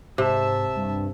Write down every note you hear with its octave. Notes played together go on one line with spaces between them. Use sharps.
G#2 C3 E5 A5
G2